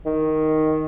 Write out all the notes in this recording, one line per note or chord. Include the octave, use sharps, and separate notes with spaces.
D#3